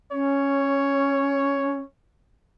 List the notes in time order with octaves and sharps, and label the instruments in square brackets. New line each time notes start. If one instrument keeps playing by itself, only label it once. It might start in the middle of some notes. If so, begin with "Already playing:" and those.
[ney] C#4 [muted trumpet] C#5